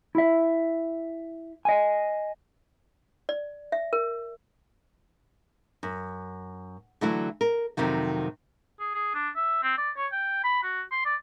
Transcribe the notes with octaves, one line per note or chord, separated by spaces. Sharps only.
E4 E5
D#5 G#5
D5
E5
A#4
F#2
D3 E3 F#3 A3 E4
A#4
F2 C3 D#3 F#3
G#4
G#4
D4
E5
C4
D5
C#5
G5
B5
F#4
C6
D5